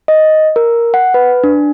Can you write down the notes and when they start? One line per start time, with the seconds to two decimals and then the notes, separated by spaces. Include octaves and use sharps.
0.08 D#5
0.56 A#4
0.94 F#5
1.14 B4
1.44 D4